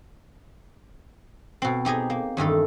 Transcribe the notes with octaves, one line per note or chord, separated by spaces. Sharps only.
B2 C4
D#4 G4 G#4 D#5
A#3
E2 G2 D#3 A4